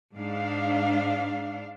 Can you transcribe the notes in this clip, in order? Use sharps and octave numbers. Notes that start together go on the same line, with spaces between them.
G#2 D4 F5